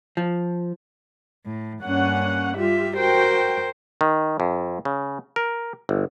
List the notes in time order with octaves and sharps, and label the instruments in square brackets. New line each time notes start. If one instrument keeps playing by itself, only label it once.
[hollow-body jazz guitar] F3
[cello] A2
[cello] G2 A#3 [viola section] C#4 F#5
[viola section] G3 F4 G4 [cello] E5
[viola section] F#4 G5 [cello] A#4 C5
[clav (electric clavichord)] D#3
F2
C#3
A#4
G1